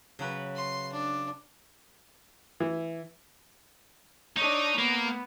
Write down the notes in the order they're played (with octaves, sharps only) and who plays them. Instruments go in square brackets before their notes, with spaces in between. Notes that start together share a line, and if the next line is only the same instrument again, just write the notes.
[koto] C#3 F#3 B4
[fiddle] C6
D4
[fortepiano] E3
[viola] D4 C#5 [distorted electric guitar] D#4 D#5
[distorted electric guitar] A#3 [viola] B3